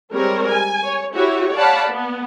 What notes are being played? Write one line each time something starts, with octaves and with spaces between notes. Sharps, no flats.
G3 G#3 C4 A#4 C#5
G#5
C#5
E4 F#4 G4 C#5
C#5 D5 F5 F#5 A5 B5
B3